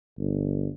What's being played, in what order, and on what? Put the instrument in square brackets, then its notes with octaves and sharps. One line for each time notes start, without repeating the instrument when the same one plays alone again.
[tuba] G1